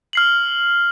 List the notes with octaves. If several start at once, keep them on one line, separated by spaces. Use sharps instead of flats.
F6 C7 F#7